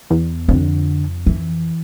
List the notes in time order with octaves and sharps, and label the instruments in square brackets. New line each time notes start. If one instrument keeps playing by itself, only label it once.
[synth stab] E2
[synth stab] F2 [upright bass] D3
[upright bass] E3